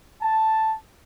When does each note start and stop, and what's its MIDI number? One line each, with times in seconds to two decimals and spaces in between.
0.22 0.73 81